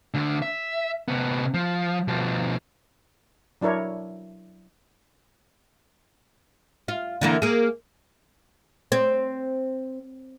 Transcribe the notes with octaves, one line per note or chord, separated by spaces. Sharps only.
D2 D3
E5
C3 B3
F3
B2 F3
F#3 D4 E4 A#4 C#5
F4
D3 E3 A#3
A#3 G#4
C4